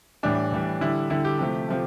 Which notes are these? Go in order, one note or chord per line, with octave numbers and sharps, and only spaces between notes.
A2 E3 G3 D4
A2 E3 G3
D3 G3 E4
D3 G3 E4
G4
C3 F3 A3
C3 F3 A3